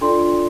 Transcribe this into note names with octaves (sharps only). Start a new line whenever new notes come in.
D4 F4 A4 D5 C6